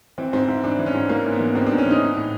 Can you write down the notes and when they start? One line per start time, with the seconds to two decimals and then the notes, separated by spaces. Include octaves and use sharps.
0.18 E3 C4
0.33 G#2 C4
0.48 G#2 E4
0.64 E3 D4
0.79 E3
0.86 C#4
0.94 G#2
1.09 G#2 A#3
1.25 E3
1.32 B3
1.40 E3
1.55 G#2 C4
1.67 G#2 D4
1.78 C#4
1.86 E3 D#4
2.02 E3
2.16 A2